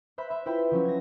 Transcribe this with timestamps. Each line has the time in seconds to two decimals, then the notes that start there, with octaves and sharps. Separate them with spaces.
0.18 C5 E5 B5 F#6
0.30 E5 B5
0.46 E4 F4 B4 C5 G5 B5
0.71 F3 F#3 C#4 F#4
0.85 G#6 A#6